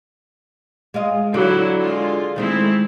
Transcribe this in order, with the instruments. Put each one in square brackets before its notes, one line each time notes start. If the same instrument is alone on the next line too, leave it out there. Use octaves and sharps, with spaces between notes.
[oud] G#3 F4 D#5
[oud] D3 [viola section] F#3 E4
[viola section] G#3 F4
[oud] D#3 G#3 A3 [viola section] C4 E4